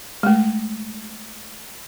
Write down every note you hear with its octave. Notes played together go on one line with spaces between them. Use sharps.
G#3 A3